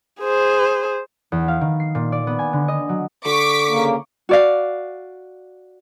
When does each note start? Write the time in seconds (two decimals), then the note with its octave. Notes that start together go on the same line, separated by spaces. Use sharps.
0.21 G#4 C5
1.32 E2
1.48 F5
1.61 D#3
1.80 C7
1.95 A#2
2.12 D5
2.27 B3
2.39 G#5
2.53 D3
2.68 D#5
2.89 F#3
3.25 D3 C#6 D6 B6
3.69 C#3 A#3
4.29 F#4 D5 F5